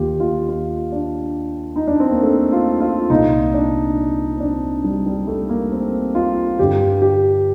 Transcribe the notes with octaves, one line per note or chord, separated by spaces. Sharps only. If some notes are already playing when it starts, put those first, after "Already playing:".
Already playing: D#2 D#3 F4 G4
F4
F4
D4
D#4
D4
C4
A#3
A3
F4
F4
C2 A#2 D#4
D4
C4
D4
G3
G3
A3
A#3
C4
F4
G2 D3 G4
G4